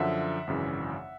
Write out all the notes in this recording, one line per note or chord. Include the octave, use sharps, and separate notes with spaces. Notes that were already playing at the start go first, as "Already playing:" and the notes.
Already playing: F#2 D3 F3 E5 F#5
G#1 F#2 C#3 E3